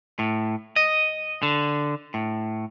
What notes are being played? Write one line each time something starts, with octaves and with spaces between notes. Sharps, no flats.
A2
D#5
D3
A2